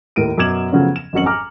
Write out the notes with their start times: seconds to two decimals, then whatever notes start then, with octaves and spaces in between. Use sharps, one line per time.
0.16 D#2 A2 A#4 D7 D#7
0.38 F#2 B2 D6 G#6 E7 F#7
0.72 C#3 F3 F#3 A3 B3 C#4
0.96 E7
1.13 G#1 F2 F#3 C#4 C#7 F#7
1.26 G#5 A#5 D6 F6